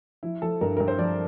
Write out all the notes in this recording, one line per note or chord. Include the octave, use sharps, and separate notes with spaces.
F3 E4
F3 A4
G2 A#4
G2 A#4
C5
F3 D5